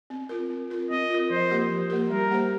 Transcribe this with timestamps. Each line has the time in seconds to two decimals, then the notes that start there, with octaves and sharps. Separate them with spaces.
0.10 C4
0.29 F4 A#4
0.50 C4
0.70 F4 A#4
0.90 C4 D#5
1.10 F4 A#4
1.30 F3 C5
1.51 A#3 G4 A#4
1.70 F3
1.90 A#3 G4 A#4
2.10 G3 A#4
2.31 A#3 G4 C5